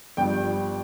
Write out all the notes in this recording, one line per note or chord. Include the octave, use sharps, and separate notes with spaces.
G1 G2 F3 G5